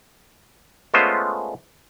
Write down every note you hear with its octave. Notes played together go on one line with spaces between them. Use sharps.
G#3 A3 B3 C#4 F4 C5